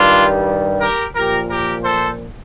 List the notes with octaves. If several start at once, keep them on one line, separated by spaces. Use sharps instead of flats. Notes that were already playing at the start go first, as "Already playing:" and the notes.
Already playing: G2 D#3 G3 D4 F4
G4 A#4
A#2 F3 G4 A#4
G4 A#4
A4 C5